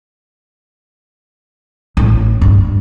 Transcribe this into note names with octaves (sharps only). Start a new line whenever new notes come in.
A1
G2